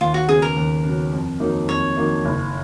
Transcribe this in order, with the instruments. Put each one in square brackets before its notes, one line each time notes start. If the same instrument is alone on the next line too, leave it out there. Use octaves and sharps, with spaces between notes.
[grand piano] D#2 [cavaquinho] F4
[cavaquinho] F#4
[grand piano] C#3 F#3 B3 [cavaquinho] G#4
[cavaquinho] A#4
[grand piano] D#2
C#3 F#3 B3
F2
D#3 F#3 A#3 D#4
[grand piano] F2 [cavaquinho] C#5
[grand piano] D#3 F#3 A#3 D#4
F#1